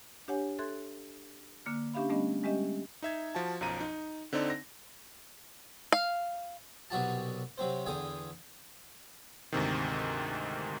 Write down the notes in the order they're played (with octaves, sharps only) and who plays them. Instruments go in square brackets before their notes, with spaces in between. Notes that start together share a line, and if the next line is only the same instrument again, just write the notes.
[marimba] D4 G4 C#5 F#5 G#5
A4 E5 C6 F#6 G#6
D3 A#3 D6 F6
C#4 D4 G4 E5 F5 B5
G3 A3 B3 C#4 D4 D#5
G3 G#3 C#4 G4 D#5 E5
[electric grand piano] D#4 E5 G#6
F3 F#4 A5
B1 F#2 F3 A#5 D#7
D#4
D3 C4 D#4 D5
A#6
[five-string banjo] F5
[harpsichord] C2 B2 F#3 F#4 G4 A5
C3 F#3 C4 C5
E2 D3 G5 G#5 D#6
[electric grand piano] D2 G#2 C3 D#3